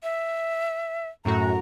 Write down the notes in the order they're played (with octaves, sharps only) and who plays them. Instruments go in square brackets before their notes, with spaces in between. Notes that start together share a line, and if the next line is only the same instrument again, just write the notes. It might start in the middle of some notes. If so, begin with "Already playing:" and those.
[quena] E5
[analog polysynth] F#2 A2 F#4 [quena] A#5